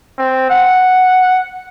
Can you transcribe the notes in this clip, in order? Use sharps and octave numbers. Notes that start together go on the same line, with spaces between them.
C4
F#5